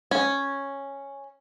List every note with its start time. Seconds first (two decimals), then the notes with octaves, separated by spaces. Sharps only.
0.11 C#4